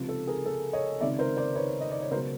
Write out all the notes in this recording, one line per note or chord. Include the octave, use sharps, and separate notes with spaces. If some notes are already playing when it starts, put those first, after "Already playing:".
Already playing: C#2 C3 F3
A4
G#4 A#4
A4
C#5 D#5
C#2 C3 D#3 D5 E5
A#4 C5
C5 D5
B4 C#5
D#5
D5
C#5
C#2 B2 F#3 A#4 C5